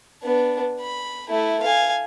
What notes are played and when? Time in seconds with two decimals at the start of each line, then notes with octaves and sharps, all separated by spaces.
0.24 B3 D4
0.80 B5
1.29 A3 E4
1.63 F5 G#5